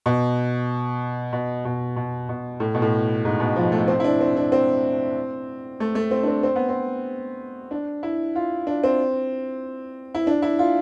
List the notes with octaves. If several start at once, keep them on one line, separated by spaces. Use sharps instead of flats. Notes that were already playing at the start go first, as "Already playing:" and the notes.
B2
B2
B2
B2
B2
A2
B2
A2
G#2
B2
F3
A3
C4
E4
D4
C4
D4
C4
A3
A3
C4
D4
C4
C4
B3
C4
D4
E4
F4
D4
C4
E4
D4
E4
F4